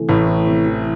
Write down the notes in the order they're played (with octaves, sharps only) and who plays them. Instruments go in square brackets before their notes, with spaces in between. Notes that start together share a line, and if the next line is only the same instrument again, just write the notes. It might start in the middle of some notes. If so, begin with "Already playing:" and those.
Already playing: [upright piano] C3 E3 A3
[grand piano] A1 A2 [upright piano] E4
[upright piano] A3
C3
E3